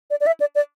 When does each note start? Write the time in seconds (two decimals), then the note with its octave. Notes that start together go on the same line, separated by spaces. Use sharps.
0.10 D5
0.21 D5
0.27 E5
0.40 D5
0.55 D5